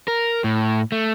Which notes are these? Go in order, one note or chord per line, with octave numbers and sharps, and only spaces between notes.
A#4
A2
A3